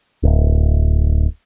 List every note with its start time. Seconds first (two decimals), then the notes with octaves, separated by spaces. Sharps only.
0.23 D1